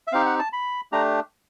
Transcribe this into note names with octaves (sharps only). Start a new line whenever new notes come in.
E5
C4 D#4 G4 F5
F#5
A5
B5
A3 D4 G4 A#5